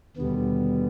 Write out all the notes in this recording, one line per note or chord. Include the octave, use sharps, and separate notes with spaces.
D#2 B2 D3 G3 B3